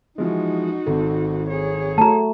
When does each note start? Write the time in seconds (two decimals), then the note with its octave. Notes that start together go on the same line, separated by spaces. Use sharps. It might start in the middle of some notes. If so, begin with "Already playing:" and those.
0.18 E3 F3 G#3 D#4 F#4
0.86 G#1 C4 A4
1.49 G#4 C#5
1.98 A3 F#4 A5 A#5